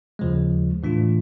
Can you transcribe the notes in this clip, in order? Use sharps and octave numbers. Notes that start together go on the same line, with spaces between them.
D#2 C#3 F3 G#3
A2 E3 A3 D4 F4